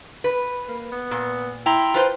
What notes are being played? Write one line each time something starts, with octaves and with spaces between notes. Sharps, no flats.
B4
A#3
B3
A#2
E4 G5 A#5 C6
F4 B4 C5